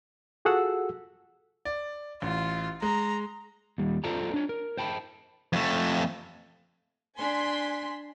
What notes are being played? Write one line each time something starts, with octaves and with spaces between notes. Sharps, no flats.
F4 F#4 G#4 A4 F#5 E6
D5
A1 F4
G#3 A#5
D#2 G3
F4 A4 C5 D5 A5 A#5
D4 C#5
A#4
C5 G5 A5 B5
F2 A3
D4 G#5 C6 B6